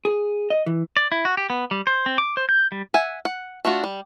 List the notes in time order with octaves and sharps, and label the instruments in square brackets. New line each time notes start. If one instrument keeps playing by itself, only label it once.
[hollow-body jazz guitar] G#4
D#5
E3
[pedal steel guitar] D5
E4
F#4
G4
B3
G3
C5
C4
D6
C5
G6
G3
[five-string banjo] E5 F#5 G#5
F#5
A3 D4 F4 F#4
G3